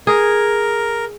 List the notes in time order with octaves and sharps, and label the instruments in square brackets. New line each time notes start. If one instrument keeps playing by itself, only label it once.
[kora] G#4 [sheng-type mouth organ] A#4